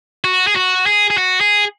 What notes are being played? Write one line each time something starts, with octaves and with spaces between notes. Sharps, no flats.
F#4
G#4
F#4
G#4
G#4
F#4
G#4